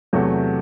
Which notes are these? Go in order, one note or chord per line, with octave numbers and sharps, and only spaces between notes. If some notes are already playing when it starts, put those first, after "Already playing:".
E2 C3 F#3 A3